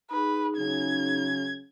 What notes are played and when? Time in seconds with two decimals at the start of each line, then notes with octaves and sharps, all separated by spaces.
0.11 D#4 G#4 B4
0.57 C#3 F#3 C#4 G#6